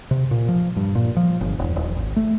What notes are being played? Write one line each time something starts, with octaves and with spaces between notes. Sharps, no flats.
C3
A#2
F3
G2
A#2
F3
G1
E1
D#1
G#1
A3